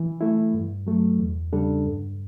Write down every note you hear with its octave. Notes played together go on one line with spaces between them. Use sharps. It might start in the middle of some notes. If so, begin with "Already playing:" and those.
Already playing: E3
A3 E4
G2
F#3 A3
E2
C#3 G3 D4 A4
G2